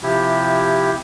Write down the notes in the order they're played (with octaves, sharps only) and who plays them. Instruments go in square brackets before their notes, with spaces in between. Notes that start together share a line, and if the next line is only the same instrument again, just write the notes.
[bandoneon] C3 F3 E4 G4